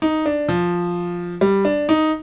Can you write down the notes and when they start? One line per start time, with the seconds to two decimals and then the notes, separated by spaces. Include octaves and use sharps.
0.02 D#4
0.26 D4
0.49 F3
1.41 G3
1.65 D4
1.89 D#4